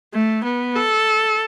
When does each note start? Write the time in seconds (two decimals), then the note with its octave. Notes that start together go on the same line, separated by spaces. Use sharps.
0.14 A3
0.44 B3
0.76 A4